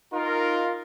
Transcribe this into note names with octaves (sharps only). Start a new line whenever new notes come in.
D#4 F4 A#4